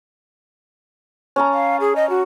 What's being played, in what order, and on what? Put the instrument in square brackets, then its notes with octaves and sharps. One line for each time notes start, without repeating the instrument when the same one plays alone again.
[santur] C#4 A5 A#5
[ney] F5
G#4
D#5
F#4